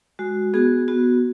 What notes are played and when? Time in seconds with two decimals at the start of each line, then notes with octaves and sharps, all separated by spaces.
0.19 G#3 F#4
0.54 B3 F#4 G#4
0.88 B3 F#4